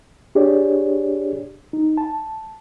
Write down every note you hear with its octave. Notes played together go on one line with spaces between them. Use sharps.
D4 G4 G#4 C#5 D5
D#4
A5